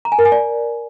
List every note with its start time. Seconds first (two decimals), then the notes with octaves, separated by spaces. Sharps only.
0.05 A#5
0.12 G#5
0.19 A#4
0.25 G#5
0.32 D5